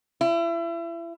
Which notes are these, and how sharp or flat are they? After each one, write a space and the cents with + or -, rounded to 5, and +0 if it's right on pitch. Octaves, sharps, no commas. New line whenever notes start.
E4 +35